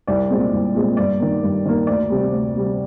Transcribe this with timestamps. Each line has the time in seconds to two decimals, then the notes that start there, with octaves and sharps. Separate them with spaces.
0.07 C2 D5
0.30 A#2 G#3 C4
0.53 C2
0.75 A#2 G#3 C4
0.97 G2 D5
1.20 D#3 A#3
1.43 G2
1.65 D#3 A#3
1.87 D2 D5
2.10 C3 G3
2.33 D2
2.55 C3 G3